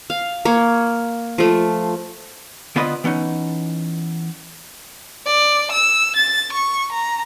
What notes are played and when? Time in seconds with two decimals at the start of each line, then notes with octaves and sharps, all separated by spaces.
0.10 F5
0.45 A#3 C#5
1.38 F3 A3
2.76 D3 B3 F4 B4 C5 D#5
3.04 E3 B3 C#4 D#4
5.27 D5
5.72 E6
6.16 A6
6.53 C#6
6.92 A#5